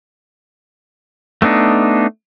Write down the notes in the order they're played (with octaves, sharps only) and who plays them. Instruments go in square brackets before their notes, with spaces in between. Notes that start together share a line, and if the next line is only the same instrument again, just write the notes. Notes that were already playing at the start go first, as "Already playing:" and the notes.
[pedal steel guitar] A3 B3 D4 D#4